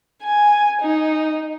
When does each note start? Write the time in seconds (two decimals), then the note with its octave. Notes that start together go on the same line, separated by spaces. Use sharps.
0.23 G#5
0.81 D#4